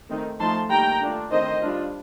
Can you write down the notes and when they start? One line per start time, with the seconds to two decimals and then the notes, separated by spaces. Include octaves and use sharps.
0.09 D#3 A3 C4 D#4
0.40 F3 A3 D#4 A5 C6
0.71 D#3 G3 A#3 G5 A#5
1.01 A3 D4 F4
1.31 D#3 A3 C4 D#4 C5 D#5
1.62 G3 D4 F4